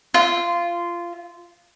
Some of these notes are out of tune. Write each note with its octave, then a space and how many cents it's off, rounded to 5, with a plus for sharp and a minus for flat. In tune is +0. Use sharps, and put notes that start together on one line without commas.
F4 -15